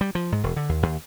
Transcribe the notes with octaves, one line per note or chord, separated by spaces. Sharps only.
G3
F3
G#2
E1
D3
D#2
D#2